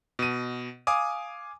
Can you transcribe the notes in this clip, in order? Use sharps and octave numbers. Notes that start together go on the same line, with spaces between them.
B2 D#7
F5 G#5 D6 D#6